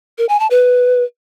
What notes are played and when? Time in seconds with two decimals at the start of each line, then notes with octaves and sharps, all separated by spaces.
0.18 A#4
0.29 G#5
0.40 A5
0.51 B4